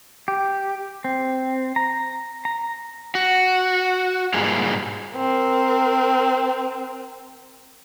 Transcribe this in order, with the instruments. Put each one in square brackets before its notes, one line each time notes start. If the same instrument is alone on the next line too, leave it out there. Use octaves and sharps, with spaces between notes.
[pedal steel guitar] G4
C4
A#5
A#5
[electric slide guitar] F#4
G#2 G3 A#3 D#4 F4 G#4
[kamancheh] C4 A#4